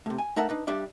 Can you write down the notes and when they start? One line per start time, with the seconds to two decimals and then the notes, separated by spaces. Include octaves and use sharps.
0.06 A2 C3
0.18 G#5
0.36 A3 D#4 A#4 E5 F#5 A5
0.49 D4 D#4 B4
0.67 G2 G3 D4 D5 E5